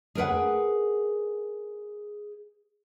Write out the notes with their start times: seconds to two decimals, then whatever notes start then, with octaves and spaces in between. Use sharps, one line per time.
0.15 G#4 A#4 B4 F#5